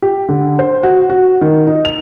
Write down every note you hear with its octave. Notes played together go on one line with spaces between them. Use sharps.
G4
D3
C5
F#4
F#4
D#3
D#4
F7